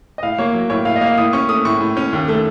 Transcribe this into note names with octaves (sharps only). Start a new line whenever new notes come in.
D#5
A2 F5
A#3 C#5
F#3
A2 C#5
A2 F5
D#5
A#3 F5
A2 D#6
C#4 C#6
A3 D#6
A2 C#6
A2
C#4
D#2
A3